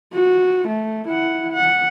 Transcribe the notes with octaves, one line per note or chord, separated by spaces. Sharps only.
F#4
A3
E4 F#5
F#5